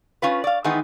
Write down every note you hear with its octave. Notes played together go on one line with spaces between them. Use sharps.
C#4 F4 B4
D5 F5
D#3 E3 G#3 B3 D#4